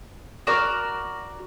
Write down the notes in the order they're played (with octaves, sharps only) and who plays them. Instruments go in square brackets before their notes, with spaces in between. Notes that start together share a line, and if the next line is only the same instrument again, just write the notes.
[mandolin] F#4 A#4 D5